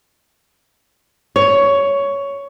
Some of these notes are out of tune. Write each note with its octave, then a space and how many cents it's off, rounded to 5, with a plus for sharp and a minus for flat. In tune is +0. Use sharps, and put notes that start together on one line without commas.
C#5 +10